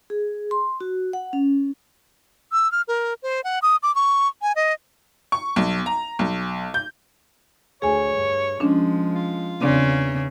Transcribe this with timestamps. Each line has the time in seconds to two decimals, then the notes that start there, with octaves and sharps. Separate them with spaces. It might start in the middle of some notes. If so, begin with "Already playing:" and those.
0.10 G#4
0.51 C6
0.81 F#4
1.13 F#5
1.33 C#4
2.52 E6
2.72 F6
2.88 A#4
3.23 C5
3.44 F#5
3.62 D#6
3.83 D6
3.95 C#6
4.42 G#5
4.56 D#5
5.32 C#6
5.56 B1
5.86 A#5
6.19 B1
6.74 G6
7.82 D2 G#4 C#5 G#5
8.12 G2
8.60 F3 G#3 C#4 D4
9.15 F4
9.62 E2 C#3 C4 D4 D5